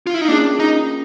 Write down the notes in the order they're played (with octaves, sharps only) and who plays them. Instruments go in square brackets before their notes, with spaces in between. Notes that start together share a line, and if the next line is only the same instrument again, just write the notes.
[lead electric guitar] F4
E4
D#4
[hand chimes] A#3 C#4 F4 G#4 [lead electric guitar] D4
[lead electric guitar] D#4